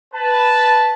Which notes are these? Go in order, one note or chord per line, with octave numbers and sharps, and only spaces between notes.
B4 A5